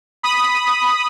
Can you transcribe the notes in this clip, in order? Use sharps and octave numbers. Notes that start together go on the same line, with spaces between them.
B5 D#6